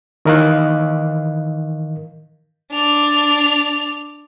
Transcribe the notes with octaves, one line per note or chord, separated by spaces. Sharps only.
D#3 E3 A#4 D#5 F5 F#6
D4 F7